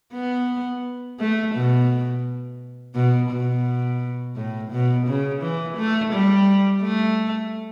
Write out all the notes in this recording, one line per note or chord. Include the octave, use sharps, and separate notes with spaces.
B3
A3
B2
B2
B2
A2
B2
C#3
E3
A3
G3
A3